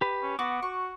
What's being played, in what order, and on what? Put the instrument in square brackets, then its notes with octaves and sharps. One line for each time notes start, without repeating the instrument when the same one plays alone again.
[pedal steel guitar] G4 B4
[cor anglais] C#4
[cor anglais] B3 [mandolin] F#4 [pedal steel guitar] D6
[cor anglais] F#4 [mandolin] C#6